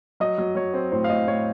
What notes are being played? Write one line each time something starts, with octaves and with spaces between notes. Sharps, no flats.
F#3 D#5
F#3
F#3 C#5
C4
A2 C5
F5
A2 D#5
A2 C#5